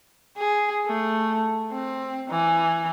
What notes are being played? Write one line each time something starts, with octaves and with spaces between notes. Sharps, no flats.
G#4
A3
C4
E3